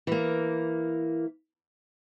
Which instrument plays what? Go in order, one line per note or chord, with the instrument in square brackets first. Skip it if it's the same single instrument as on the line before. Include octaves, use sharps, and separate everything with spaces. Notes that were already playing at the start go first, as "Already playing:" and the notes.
[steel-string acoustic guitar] E3 A#3